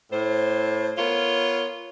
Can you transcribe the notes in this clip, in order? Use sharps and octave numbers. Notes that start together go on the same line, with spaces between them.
A2 C5
B3 F4 A#4 C#5